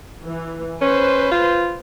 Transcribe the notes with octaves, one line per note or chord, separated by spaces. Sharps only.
E3
C#4 B4 C5
F4